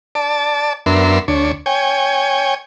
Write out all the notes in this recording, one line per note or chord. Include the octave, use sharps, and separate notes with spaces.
D5 A5
F#2 B3 D4 A#4 E5 C6
D2 D4 C#5
C#5 G5 G#5